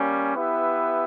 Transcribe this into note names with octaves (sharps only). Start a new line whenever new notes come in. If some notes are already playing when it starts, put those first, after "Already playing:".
Already playing: G3 A#3 C#4
B3 E4 G4 B4 E5